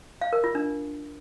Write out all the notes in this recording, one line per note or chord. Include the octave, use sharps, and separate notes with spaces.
F5
A#4
F4
D4